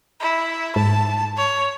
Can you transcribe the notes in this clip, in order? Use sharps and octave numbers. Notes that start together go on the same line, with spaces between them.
E4
G#2 A5
C#5